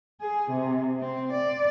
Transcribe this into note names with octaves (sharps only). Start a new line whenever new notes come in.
G#4
C3
C4
D5